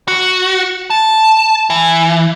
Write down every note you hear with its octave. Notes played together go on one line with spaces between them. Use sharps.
F#4
A5
E3